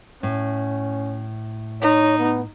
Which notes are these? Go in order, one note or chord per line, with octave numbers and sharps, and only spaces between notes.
A2 C#4
D#4 C#5
B3